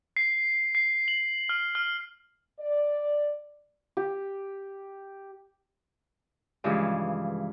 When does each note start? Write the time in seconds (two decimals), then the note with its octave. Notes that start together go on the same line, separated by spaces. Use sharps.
0.17 C7
0.75 C7
1.08 F#7
1.49 F6
1.75 F6
2.59 D5
3.97 G4
6.64 G2 C#3 E3 F3 G#3